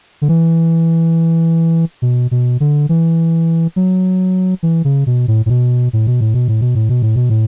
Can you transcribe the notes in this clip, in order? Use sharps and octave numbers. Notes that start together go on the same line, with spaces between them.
D3
E3
B2
B2
D3
E3
F#3
E3
C#3
B2
A2
A2
B2
A2
B2
A2
B2
A2
B2
A2
B2
A2
B2
A2